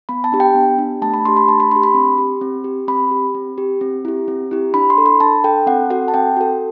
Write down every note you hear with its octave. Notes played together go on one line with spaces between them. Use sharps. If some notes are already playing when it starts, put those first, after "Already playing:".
B3 B5
A5
D4 G4
G5
B3
D4 G4
A3 A5
B5
D4 G4 C6
B5
A3 A5
B5
D4 G4 C6
B5
C4
G4
C4
G4
C4 B5
G4
C4
G4
C4
E4 G4
C4
E4 G4
D4 B5
C6
A4
B5
D4 A5
A4 G5
C4 F#5
F#4 A4 F#5
A5
C4 G5
F#4 A4